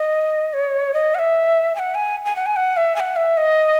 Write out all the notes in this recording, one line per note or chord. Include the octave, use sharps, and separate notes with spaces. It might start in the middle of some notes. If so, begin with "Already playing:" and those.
Already playing: D#5
C#5
D#5
F#5
E5
G#5
F#5
G#5
G#5
F#5
G#5
F#5
E5
G#5
F#5
E5
D#5